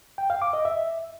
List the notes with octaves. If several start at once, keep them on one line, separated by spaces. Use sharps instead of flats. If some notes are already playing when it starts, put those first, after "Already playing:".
G5
F5
D6
D#5
E5